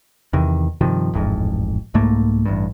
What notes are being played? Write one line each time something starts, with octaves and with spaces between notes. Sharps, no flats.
E2 C3 D#3
G2 C3 D#3 F3
D1 A1 F2 G#2
C2 G#2 A3 A#3
A1 G2